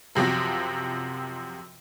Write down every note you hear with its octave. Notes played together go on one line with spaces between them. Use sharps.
F#2 C3 F3 F#3 C4